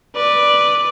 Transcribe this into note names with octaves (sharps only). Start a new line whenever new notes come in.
B4 D5